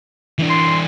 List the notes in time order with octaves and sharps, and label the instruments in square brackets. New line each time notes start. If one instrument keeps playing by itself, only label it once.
[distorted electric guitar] E3 D4
[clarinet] C6